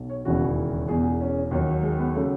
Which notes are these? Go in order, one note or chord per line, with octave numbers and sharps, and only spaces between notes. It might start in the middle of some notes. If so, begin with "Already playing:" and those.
Already playing: B1 B2
C#5
E1 D#2 C#3 E3 F#4
E1 E2 B2 G#4
G#4
C#4
D#2 D#3 F#3
G#3
B3
C#3 F#3 A3